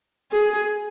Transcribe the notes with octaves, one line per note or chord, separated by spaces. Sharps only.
G#4